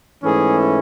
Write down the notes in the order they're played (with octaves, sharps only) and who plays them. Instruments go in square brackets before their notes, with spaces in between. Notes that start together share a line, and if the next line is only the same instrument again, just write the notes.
[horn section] G#2 E3 A3 C#4 G#4